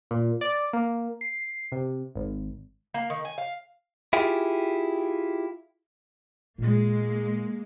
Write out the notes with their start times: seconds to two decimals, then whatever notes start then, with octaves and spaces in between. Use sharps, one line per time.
0.11 A#2
0.41 D5
0.73 A#3
1.21 C7
1.72 C3
2.15 G#1
2.94 A#3
3.10 D#3
3.25 G#5
3.38 F5
4.13 E4 F4 G4 G#4
6.58 A#2 G#3 A#3 D#4